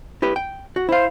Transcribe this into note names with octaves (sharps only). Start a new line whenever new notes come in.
E4 G4 B4
G5
F#4
E4 C5 F5